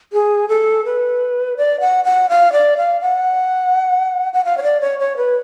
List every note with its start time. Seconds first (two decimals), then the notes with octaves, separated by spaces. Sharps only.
0.13 G#4
0.49 A4
0.85 B4
1.57 D5
1.80 F#5
2.05 F#5
2.29 F5
2.53 D5
2.77 F5
3.01 F#5
4.34 F#5
4.45 F5
4.58 C#5
4.63 D5
4.81 C#5
4.99 C#5
5.17 B4